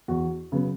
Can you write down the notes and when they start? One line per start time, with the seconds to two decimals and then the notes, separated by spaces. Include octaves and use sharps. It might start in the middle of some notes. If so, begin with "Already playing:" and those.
0.08 E2 F#4
0.52 C#3 F#3 B3